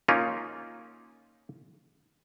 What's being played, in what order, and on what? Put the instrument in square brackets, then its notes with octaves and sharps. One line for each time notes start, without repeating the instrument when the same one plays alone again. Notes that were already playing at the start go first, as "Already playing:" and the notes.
[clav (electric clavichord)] A#3 C#4 D#4 F4